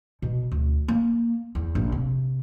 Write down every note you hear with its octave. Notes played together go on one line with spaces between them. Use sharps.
B2
D2
A#3
E2
A#1
C3